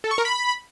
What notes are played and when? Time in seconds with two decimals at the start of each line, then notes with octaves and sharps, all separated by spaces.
0.04 A4
0.11 C#6
0.18 A#4
0.25 B5